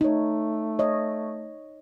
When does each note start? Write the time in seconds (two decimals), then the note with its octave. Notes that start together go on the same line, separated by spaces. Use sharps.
0.01 A3 D#4 C#5
0.79 C#5 D#5